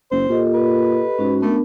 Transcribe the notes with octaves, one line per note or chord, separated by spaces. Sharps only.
F#1 C5
A#2 G4 A4 D#5
B4
G#2 C#4 F#4
A3 B3 D4 A#4